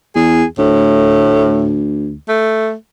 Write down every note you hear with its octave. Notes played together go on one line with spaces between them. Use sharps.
E2 G#4
D2 A2
A3